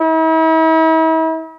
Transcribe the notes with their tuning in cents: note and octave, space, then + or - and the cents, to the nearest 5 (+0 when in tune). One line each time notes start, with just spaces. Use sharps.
E4 -45